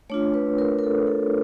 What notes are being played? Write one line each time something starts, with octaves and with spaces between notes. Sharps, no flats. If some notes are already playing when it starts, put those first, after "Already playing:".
A3 D4 F4 C#5
B4
A#4
A#4
A4
A4